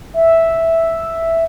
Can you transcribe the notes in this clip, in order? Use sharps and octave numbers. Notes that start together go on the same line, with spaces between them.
E5